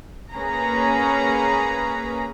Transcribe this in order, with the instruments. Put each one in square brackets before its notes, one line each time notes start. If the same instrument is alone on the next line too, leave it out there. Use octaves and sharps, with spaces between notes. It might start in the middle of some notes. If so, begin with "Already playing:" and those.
[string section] A#3 C#4 G#4 B4 A#5